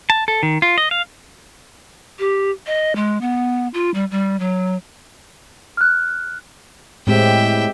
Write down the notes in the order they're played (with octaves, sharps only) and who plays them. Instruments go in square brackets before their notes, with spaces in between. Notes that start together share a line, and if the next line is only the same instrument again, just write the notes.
[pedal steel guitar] A5
A4
D#3
F4
D#5
F5
[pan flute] G4
D#5
G#3
B3
F4
G3
G3
F#3
[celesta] F6 F#6
[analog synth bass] A2 [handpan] G#3 C4 G4 [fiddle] E5 G5